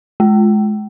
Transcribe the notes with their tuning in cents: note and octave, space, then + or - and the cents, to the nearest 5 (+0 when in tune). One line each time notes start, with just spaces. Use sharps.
G#3 +25